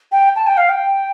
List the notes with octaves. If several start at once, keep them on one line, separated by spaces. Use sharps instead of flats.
G5
A5
G5
F5
G5